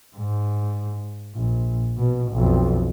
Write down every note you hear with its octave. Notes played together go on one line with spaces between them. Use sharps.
G#2
A#1
B2
B1 F2